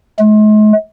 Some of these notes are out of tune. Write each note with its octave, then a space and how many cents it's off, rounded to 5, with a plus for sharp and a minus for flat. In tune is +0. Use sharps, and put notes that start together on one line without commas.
G#3 +45